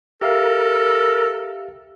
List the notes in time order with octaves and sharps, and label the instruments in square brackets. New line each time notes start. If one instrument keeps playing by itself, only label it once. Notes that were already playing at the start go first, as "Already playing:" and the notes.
[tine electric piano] G4 E5 F5 [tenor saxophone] A4 [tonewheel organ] A#4